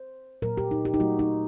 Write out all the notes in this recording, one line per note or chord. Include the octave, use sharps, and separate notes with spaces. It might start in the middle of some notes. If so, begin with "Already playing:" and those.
Already playing: C5
A#2 F#3 A#3 A#4
G4
D#4
G4
D#4
A#2 F#3 A3 F#4
D#4